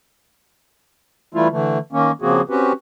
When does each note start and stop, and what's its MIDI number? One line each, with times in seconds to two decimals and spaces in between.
1.35 1.48 52
1.35 1.48 55
1.35 1.48 57
1.35 1.48 64
1.35 1.48 65
1.51 1.78 50
1.51 1.78 52
1.51 1.78 57
1.93 2.12 51
1.93 2.12 58
1.93 2.12 61
2.22 2.41 49
2.22 2.41 53
2.22 2.41 58
2.22 2.41 60
2.22 2.41 66
2.22 2.41 68
2.49 2.72 60
2.49 2.72 61
2.49 2.72 66
2.49 2.72 67
2.49 2.72 71